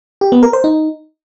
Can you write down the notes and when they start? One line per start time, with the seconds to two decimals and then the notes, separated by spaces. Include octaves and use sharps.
0.21 G4
0.32 B3
0.43 A#4
0.53 C5
0.64 D#4